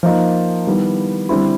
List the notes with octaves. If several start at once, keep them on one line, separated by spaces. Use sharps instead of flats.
F3 A#3 D#4
D#3 G3 B3 E4
D3 G3 C4 E4